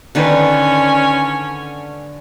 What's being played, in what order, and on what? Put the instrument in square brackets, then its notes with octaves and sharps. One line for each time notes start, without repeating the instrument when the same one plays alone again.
[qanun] D3 D#3 B4 [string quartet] C#4